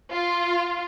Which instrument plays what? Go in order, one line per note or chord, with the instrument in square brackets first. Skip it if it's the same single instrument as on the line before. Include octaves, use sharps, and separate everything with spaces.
[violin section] F4